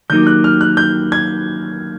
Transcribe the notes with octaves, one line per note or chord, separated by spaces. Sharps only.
D#3 F#3 A#3 D#4 G4 G6
F#6
F6
F#6
G6
G#6